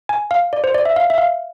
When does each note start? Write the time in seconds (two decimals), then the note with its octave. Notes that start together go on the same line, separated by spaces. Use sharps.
0.09 G#5
0.31 F5
0.53 D5
0.64 C5
0.74 D5
0.85 E5
0.96 F5
1.10 E5
1.18 F5